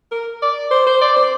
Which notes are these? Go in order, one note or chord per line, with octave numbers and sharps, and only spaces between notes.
A#4
D5
C5
C5
D5
C5